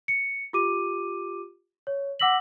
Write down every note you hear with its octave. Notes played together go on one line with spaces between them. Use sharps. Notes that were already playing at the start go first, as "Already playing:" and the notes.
C#7
F4 G4 D6 D#7
C#5
F#5 D6 E6 A#6 B6 F#7